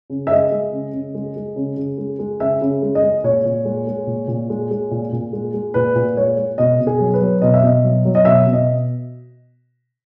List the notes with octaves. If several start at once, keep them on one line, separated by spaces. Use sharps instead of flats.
C#3
E5
G#3 D#5
G#3
C#3
C#3
G#3
G#3
C#3
C#3
G#3
G#3
C#3 E5
C#3
G#3
D#5
G#3
A#2 C#5
A#2
G#3
G#3
A#2
A#2
G#3
G#3
A#2
A#2
G#3
G#3
A#2 B4
A#2
G#3 C#5
G#3
B2 D#5
B2
G#4
F#3
B4
F#3
B2 D#5
E5
B2 D#5
F#3
F#3
D#5
B2 E5
B2
D#5